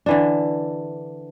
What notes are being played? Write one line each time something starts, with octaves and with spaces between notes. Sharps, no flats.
D3 E3 D4